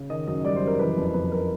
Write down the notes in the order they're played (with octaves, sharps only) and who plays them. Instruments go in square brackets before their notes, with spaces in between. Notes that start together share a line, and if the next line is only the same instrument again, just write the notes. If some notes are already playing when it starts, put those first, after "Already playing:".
Already playing: [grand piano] C#3
D#3 D#5
F#2 D#5
G3 D5
C5
F#2
A#4
E3 B4
F2
F2 B4
A#4